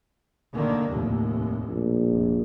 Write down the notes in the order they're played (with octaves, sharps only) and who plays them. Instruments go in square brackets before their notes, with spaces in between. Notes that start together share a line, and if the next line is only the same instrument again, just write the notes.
[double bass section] D3 D#3 A#3
F1 D#2 A2
[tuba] A#1
[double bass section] F1